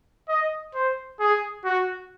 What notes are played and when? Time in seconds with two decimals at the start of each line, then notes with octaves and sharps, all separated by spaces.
0.29 D#5
0.75 C5
1.20 G#4
1.65 F#4